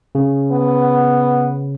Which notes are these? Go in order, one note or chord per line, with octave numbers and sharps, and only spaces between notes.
C#3
B3